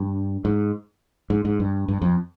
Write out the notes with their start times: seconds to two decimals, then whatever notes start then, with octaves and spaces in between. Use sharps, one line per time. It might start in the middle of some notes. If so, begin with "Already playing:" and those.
Already playing: G2
0.45 G#2
1.30 G#2
1.45 G#2
1.60 G2
1.88 G2
2.02 F2